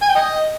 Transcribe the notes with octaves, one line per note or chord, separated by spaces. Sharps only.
G#5
G5
D#5